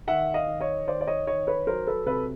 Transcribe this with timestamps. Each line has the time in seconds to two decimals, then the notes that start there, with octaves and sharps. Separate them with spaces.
0.08 D#3 E5 F#5
0.34 D#5 F5
0.48 D#3
0.60 C#5 D#5
0.87 D#3 C5 D5
1.01 D5
1.07 C#5 D#5
1.27 D#3 C#5 D#5
1.47 B4 C#5
1.67 F#3 A#4 C5
1.87 A4 B4
2.06 C3 A4 B4